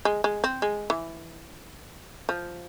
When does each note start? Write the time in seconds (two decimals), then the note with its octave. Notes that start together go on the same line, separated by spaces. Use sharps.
0.05 G#3
0.24 G#3
0.44 C4
0.62 G#3
0.90 E3
2.29 F3